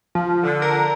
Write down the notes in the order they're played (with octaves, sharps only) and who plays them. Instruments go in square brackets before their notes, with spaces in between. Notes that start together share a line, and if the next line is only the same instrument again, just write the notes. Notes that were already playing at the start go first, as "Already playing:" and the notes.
[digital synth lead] F3
[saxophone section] D3
[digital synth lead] A#4